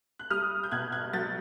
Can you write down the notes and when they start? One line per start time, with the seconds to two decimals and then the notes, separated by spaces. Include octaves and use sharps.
0.19 F#6
0.30 G3 D#6 F6
0.64 G6
0.71 B2 F#6 G#6
0.92 F#6 G#6
1.13 F#3 G6 A6